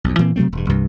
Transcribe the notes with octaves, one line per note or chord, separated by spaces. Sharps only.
B1 F2
A#2 E3 A#3 C4
C3 F#3 A3 C4
E1 G2
C2 G2 C3 E3